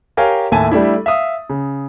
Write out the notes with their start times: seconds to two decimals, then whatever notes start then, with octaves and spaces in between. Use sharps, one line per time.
0.17 G4 A#4 C#5 F5 G5 G#5
0.52 D#2 A2 E5 G#5 A5 D#7
0.71 G3 A3 D4 E4
1.06 E5 F5 D#6
1.50 C#3